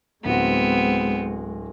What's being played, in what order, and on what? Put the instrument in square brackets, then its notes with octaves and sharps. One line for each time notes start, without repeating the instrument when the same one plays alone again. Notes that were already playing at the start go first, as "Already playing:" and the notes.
[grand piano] D1 F#4 [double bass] G#3 [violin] B3 C4